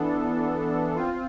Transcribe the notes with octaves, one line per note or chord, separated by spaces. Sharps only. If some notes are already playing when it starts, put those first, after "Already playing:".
Already playing: E3 B3 D4 A4
C4 F4